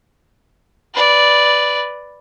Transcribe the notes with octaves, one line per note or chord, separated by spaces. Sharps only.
B4 D5